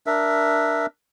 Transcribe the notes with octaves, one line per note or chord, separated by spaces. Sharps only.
D4 A#4 E5